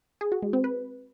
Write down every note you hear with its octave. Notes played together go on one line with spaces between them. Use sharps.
G#4
F#4
G#3
C4
B4